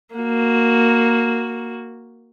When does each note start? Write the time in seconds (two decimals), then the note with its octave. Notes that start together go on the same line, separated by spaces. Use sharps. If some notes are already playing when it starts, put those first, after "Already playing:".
0.15 A#3 F#4